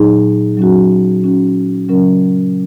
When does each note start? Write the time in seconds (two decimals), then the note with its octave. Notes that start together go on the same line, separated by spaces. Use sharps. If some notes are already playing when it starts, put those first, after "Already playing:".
Already playing: A#2 F#3 D#4 G#4
0.57 F#3 C#4 F#4
1.23 F#3 C#4 F#4
1.89 C#3 F#3 C#4 A#4